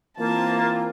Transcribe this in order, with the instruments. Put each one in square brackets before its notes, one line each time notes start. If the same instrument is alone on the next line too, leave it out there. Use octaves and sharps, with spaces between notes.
[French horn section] E3 C4 F4 [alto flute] A#3 [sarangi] A5